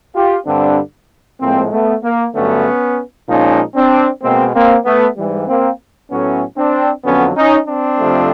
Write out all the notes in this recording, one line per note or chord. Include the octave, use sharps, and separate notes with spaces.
F4 G4
G2 D3 G3 C4 D4
A2 F3 G#3 A#3 C4
A3 B3
A#3
G2 D3 F#3 A3 B3 C#4
A#2 F3 G#3 C#4 D#4
C4 D4
B2 G#3 A#3 C4
A#3 C4
A3 B3
G#2 E3 G3
A#3 C4
A2 F#3 A3 B3 C#4
C4 D4
F2 D3 F#3 B3 C#4
C#4 D#4
C4 D4
F2 C3 F3 A3